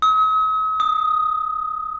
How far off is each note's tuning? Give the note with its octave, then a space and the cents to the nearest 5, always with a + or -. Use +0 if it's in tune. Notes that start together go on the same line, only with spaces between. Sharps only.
D#6 +45
D#6 +0